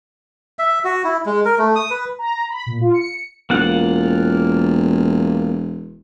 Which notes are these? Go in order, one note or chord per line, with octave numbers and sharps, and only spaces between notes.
E5
F#4
E4
G#3
A#4
A3
D#6
B4
A#5
B5
A#2
F4
C#7
E1 A#3 F4 F#5